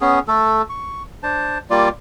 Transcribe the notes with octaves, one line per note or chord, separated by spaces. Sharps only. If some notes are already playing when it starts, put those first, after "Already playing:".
B3 C#4 G#4
A3 A4
C#6
D4 C5 A5
G3 A#3 F4 D5